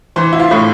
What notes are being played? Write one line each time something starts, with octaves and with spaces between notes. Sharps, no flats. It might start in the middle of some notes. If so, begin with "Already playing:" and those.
E3 C5
E4
F4
A2